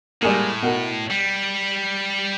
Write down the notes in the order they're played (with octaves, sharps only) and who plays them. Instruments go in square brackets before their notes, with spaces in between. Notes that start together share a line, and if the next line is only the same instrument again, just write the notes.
[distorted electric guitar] A2 [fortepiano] G3 G#3 A#3
[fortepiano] B2 A#4 F#5
[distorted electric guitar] G3